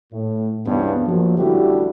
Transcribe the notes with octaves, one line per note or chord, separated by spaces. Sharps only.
A2
C#2 G2 C3 E3 B3
A#1 F3 F#3
A1 D3 G3 E4 F#4 G4